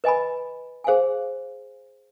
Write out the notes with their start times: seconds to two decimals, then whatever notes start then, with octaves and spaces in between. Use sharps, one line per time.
0.04 B4 D#5 G#5 B5
0.84 G#4 C5 F5 G#5